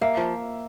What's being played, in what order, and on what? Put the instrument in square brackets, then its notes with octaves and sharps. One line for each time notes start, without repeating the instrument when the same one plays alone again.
[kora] A#3 [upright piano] E5
[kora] F3